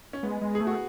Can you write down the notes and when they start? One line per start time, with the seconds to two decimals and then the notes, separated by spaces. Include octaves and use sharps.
0.13 C#4
0.23 G#3 B3
0.41 G#3
0.55 G#4
0.60 A3
0.67 F#4